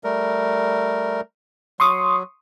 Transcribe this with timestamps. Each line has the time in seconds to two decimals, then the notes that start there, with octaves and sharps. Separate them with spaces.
0.04 G3 A3 A#4
1.80 F#3 C6 C#6 D#6